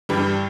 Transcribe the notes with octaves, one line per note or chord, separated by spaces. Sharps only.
G2 E3 G3